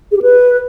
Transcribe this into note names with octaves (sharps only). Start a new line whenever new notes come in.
G#4
G4
B4